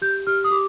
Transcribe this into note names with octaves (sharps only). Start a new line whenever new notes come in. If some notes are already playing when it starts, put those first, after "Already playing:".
G4 G6
G4 F6
D#6
G4 D6